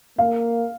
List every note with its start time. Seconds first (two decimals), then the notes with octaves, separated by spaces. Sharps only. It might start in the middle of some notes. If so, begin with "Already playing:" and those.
0.18 A#3 F5